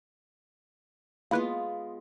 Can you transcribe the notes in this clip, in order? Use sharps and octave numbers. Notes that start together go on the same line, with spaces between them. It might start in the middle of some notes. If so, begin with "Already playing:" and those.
G#3 A#3 B3 E4 F4 B4